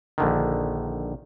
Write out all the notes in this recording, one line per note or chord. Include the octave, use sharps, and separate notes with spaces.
A#1 D3 D#3